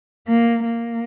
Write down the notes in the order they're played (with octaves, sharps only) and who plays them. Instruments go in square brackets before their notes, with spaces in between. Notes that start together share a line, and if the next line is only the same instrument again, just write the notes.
[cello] A#3
A#3